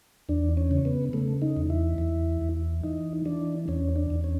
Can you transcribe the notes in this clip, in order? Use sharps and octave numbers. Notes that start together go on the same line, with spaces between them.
E2 D4
C#4
C#3
B3
C#3 A3
D#4
E2
E4
E2
E2
E3 D#4
E3 D4
E2 C#4
D4
E2
C#4